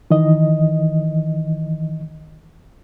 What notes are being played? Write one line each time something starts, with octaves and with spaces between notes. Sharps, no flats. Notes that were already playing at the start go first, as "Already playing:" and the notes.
D#3 E3 D#5